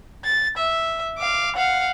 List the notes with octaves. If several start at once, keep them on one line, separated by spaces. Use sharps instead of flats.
A6
E5
F5 D6
F5 F#5